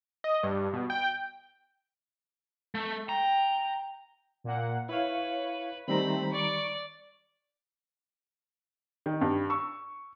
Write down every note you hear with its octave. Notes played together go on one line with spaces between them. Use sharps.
D#5
G2
B2
G5
A3
G5 A#5
A#2 A#3 F#5
E4 B4 C#5 F5
D#3 G3 A3 C4 C5 A#5 B5
D5 C#6 C#7 D7
D#3
G2
C#6 E6